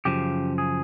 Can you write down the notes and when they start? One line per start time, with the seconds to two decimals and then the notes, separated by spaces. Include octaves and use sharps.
0.05 F#2 C#3 F3 G4
0.58 G#4